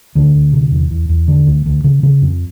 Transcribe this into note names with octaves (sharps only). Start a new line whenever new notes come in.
D2 D3
D2
C3
E2
E2
E2
D3
D2
D2
C#3
C#3
F2